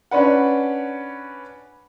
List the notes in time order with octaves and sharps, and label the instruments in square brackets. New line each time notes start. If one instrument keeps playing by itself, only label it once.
[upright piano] C#4 D4 B4 F#5